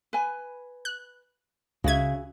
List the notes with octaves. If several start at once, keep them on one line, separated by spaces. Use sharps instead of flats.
B4 G#5
F#6
C#2 C#3 F#4 G#4 E5 G#6